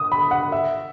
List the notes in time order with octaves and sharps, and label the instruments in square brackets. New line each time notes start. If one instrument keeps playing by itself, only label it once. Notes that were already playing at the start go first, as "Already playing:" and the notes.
Already playing: [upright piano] D#6
B5
F#5
E5